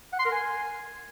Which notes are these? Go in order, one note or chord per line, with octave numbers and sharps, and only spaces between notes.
F#5
C6
A#4
G#5